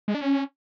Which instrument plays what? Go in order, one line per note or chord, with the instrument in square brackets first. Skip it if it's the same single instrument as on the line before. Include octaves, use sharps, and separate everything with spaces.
[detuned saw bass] G#3
D4
C#4